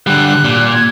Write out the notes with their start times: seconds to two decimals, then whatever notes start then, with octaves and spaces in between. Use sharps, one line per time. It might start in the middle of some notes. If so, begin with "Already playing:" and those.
0.07 D3 G3 F#6
0.45 A#2
0.73 G#6